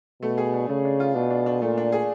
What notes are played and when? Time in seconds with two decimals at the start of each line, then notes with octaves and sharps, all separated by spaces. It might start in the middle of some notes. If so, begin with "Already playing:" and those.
0.22 B2 A3
0.38 G#4
0.54 D4
0.69 C#3 A3
0.85 D4
1.00 F4
1.15 B2 D4
1.30 D4
1.46 D4
1.61 A#2 A3
1.78 D4
1.92 G#4